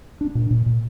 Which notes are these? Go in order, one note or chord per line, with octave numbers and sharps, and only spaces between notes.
D4
A#2
A#2
A#2